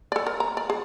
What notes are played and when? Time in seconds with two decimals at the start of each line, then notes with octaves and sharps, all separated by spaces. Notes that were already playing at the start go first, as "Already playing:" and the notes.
0.12 A4 D5
0.27 A#4
0.40 A#5
0.57 D5
0.70 G#4